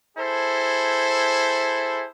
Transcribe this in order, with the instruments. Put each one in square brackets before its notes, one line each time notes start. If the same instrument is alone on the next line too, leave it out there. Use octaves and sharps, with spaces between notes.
[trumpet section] E4 G#4 A4 C5